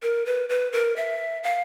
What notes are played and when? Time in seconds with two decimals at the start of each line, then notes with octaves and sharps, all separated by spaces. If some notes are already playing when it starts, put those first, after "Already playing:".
0.03 A#4
0.26 B4
0.49 B4
0.72 A#4
0.96 E5
1.43 F5